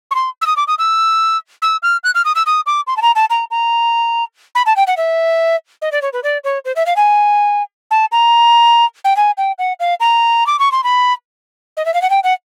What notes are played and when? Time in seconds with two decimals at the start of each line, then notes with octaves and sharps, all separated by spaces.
0.11 C#6
0.15 C6
0.42 E6
0.46 D#6
0.57 D6
0.67 D#6
0.79 E6
1.62 E6
1.83 F6
2.04 F#6
2.15 F6
2.25 D#6
2.35 E6
2.46 D#6
2.66 D6
2.87 C6
2.97 A5
3.02 A#5
3.16 A5
3.30 A#5
3.51 A#5
4.55 B5
4.66 A5
4.76 G5
4.87 F#5
4.97 E5
5.82 D#5
5.92 D5
6.02 C#5
6.13 B4
6.23 D5
6.44 C#5
6.65 C5
6.76 E5
6.86 F5
6.96 G#5
7.91 A5
8.12 A#5
9.05 G5
9.17 G#5
9.37 G5
9.59 F#5
9.80 F5
10.00 A#5
10.47 D6
10.59 C#6
10.72 C6
10.84 B5
11.77 D#5
11.86 E5
11.94 F5
12.02 F#5
12.10 G5
12.24 F#5